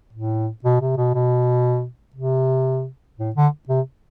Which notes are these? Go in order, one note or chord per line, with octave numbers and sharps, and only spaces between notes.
A2
B2
C3
B2
B2
C3
A2
D3
C3